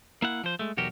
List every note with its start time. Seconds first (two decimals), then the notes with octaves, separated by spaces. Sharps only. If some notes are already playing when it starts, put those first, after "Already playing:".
0.22 A#3 E4 F#5
0.44 F3 C5
0.59 G#3 A3
0.77 B1 E2 F#4 G4 A#4